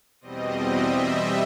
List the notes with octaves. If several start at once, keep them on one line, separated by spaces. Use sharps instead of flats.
E2 B2 G3 C4 D#5
E5